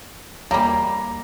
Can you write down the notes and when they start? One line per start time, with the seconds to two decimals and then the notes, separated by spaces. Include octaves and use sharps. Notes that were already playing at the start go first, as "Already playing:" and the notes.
0.51 G3 A#3 A#5